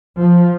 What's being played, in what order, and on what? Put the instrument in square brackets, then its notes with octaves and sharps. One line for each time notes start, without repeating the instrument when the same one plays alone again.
[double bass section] F3